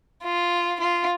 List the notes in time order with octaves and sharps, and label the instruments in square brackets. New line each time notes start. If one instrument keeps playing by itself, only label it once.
[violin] F4
F4